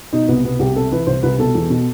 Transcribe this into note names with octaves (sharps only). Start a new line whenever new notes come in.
B2 D#4
C2 B3
B2 B3
C2 G4
C3 A4
E3 B4
C2 C5
C2 B4
B2 A4
E2
B2